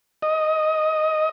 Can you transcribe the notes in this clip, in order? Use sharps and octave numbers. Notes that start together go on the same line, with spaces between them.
D#5